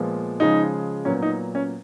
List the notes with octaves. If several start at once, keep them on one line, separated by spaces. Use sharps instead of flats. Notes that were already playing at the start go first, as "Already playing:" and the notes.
Already playing: A#2 F3 G#3 B3
C#3 F3 G#3 D#4
A#2 F#3 B3 C#4
D#4
C#4